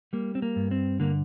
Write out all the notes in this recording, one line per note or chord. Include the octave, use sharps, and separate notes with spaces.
G3 A#3
C4
A#3
G2
C4
D3 A#3